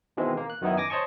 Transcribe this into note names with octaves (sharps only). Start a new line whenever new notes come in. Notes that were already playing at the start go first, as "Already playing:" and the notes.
B2 D#3 E3 G#3 C4
A#3
F#6
F#2 D#3 B3 D#4 E4
G#5 D6 A#6
C5 C#5 D#5 A5 C#6